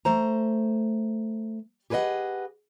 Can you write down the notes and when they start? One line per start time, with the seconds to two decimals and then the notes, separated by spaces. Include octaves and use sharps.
0.05 A3 C5 A#5
1.90 G4 G#4 B4 C#5 D#5 F#5